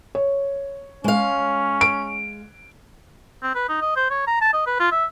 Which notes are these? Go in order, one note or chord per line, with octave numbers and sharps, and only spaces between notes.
C#5
G#3 C#4 F5
D7
C4
B4
D#4
D#5
C5
C#5
A#5
A5
D#5
B4
F4
E5